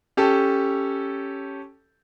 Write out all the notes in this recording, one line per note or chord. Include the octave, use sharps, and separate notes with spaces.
C#4 G4 A4 A5